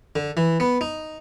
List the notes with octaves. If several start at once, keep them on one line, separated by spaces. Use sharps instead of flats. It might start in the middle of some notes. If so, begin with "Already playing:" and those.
D3
E3
B3
D#4